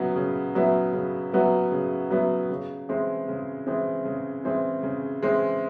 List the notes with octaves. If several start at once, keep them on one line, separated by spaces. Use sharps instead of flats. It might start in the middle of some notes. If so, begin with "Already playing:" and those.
Already playing: C#3 F#3 B3 E4
C#3
F#3 B3 E4
C#3
F#3 B3 E4
C#3
F#3 B3 E4
C#3
E3 G#3 C4
C#3
E3 G#3 C4
C#3
E3 G#3 C4
C#3
E3 G#3 C4